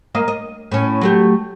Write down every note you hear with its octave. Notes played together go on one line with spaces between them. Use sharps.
A#3 D#5 F5
D#5
A2 C#4
F#3 A3 G4